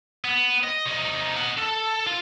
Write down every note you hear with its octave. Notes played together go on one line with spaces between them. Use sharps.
B3
D#5
C3 D#4
D#5 F#5
A4
F4